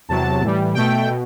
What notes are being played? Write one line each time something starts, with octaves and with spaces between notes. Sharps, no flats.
E2 C3 F#3 A5
A2 E3 G3
B2 A3 G5
B2